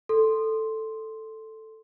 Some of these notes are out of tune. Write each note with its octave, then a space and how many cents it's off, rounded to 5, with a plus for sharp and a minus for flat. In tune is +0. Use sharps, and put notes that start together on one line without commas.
A4 +0 C6 +0